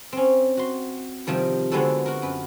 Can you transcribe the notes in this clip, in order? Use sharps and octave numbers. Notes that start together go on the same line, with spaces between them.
C4 C#4
F#4 C6
C3 D#3 F3 G3
D3 G#3 B3 C4 F#4 A4
F#4 A#4
F#2 B4